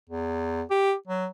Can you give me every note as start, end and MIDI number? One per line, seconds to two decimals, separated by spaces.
0.09 0.62 40
0.70 0.94 67
1.07 1.27 54